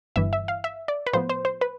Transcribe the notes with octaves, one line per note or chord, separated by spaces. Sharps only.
G1 G2 E3 E5
E5
F5
E5
D5
B4
A2 F3 B3 C5
C5
C5
B4